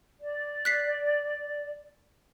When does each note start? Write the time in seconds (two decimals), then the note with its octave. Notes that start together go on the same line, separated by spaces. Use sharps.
0.20 D5
0.65 F#6 B6 C7